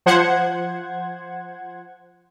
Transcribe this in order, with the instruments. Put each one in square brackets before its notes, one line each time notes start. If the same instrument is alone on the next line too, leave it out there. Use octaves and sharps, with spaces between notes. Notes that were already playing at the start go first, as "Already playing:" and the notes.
[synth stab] F3 C5 F#5 G#6